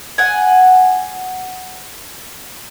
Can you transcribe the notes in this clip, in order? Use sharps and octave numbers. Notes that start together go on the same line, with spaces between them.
F#5 G#5